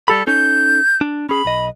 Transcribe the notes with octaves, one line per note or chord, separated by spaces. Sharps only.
G3 G4 A4 B5
C#4 D#4 A4 G6
D4
C#4 G#4 B5
B1 D#5